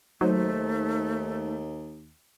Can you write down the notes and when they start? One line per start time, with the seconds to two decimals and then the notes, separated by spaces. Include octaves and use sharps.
0.21 D#2 F#3 A3 D#4 C5